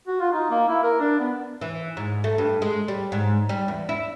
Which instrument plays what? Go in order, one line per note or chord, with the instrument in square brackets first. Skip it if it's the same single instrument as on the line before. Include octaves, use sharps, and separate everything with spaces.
[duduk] F#4
F4
D#4
A#3
E4
A#4
D4
B3
[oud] E3
G#2
A3
G2
G#3
G3
G#2
G3
E2
E4